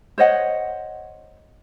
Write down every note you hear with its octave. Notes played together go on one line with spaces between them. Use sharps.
C5 C#5 D#5 F#5